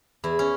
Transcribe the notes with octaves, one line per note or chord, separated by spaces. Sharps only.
E2 E4
C#4